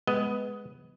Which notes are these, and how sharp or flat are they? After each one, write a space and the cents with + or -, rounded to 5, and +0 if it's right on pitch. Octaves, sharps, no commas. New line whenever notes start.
G#3 +0 B3 +0 D#5 +15